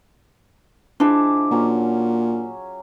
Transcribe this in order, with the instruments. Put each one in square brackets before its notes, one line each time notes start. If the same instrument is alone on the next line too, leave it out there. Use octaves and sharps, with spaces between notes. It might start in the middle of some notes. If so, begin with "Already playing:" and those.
[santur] F3 G#3 D6 [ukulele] D4 E4
[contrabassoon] A#2 [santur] F#3 C#4